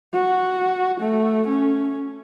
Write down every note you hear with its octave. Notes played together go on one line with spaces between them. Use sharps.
F#4
A3
C#4